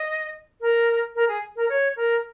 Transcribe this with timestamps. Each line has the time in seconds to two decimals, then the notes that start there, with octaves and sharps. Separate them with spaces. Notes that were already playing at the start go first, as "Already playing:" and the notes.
Already playing: D#5
0.60 A#4
1.15 A#4
1.28 G#4
1.55 A#4
1.69 C#5
1.96 A#4